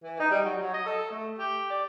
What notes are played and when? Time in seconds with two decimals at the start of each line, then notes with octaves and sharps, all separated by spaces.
0.04 E3
0.20 D#4
0.31 G3
0.45 F#3
0.62 F#3
0.74 D#5
0.86 A4
1.11 A3
1.38 G4
1.70 D5